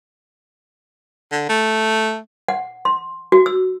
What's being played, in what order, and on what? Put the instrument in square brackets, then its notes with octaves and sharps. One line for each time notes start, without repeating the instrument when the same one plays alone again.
[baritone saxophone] D3
A3
[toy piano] F#5
C6
F#4
E6